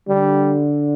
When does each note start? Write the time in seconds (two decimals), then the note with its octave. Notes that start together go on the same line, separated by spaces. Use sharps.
0.08 D3 G3